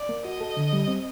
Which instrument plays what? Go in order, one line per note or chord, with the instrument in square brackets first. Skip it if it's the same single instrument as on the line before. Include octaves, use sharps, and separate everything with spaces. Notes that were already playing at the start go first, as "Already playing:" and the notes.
Already playing: [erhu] D5
[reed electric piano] A#3
[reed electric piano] F#4 [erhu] D#5
[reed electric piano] A4
D3
G3
C4